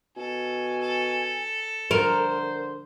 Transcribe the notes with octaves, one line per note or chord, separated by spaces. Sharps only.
B2 A4 G#5
A4
D3 A#4 C5